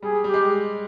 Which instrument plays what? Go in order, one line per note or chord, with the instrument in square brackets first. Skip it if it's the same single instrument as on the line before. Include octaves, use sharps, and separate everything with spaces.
[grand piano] G3 [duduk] G#4
[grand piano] G3 [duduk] G4
[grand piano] G#3